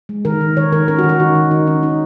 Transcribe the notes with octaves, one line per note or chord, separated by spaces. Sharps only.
G#3
D#3 A#4
D#3
D#3 C#5
D#3 A#4
C#4 A#4
F#4
D#3
F#4
D#3 D#4
D#3
D#3 D#4
D#3 C#4
C#4 D#4